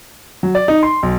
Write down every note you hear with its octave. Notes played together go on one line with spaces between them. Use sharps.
F#3
D5
D#4
C6
B1